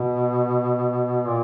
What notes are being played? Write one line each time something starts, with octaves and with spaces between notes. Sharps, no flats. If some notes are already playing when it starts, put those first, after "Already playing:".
Already playing: B2
A#2